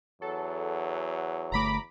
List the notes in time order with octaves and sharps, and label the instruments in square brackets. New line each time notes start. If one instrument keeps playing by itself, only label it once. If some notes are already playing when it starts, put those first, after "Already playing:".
[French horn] E2 [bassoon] F#3 [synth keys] A4
[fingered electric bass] G1 D3 A3 [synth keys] A#5 B5 D6